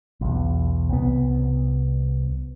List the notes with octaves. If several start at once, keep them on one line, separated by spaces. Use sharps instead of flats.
B1 E2
C2 B3